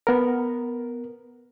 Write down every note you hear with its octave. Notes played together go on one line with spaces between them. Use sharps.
B3 A#4